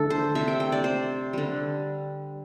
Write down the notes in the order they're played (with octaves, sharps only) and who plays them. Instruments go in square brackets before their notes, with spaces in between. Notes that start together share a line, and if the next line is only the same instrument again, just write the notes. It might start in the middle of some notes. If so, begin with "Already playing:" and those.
Already playing: [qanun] D3 A3 D4 A4
C5
C3 A3 E5
G5
G5
D5
C5
D3 G3